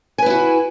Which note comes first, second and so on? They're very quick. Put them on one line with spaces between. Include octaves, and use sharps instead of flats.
G#5 B4 E4 F#4